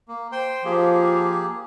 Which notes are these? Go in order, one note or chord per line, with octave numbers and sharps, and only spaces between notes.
A#3
C5 G5 C6
F3 A#3 G4 G#4